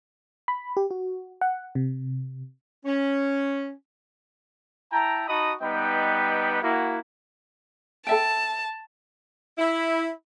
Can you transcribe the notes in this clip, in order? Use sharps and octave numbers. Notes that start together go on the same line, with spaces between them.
B5
G4
F#4
F#5
C3
C#4
E4 G5 A5 A#5
D#4 F#4 D#5 A5 B5 D#6
G3 B3 D#4 B4 D#5 G5
A#3 E4 F#4
A4 E5 G5 A5
E4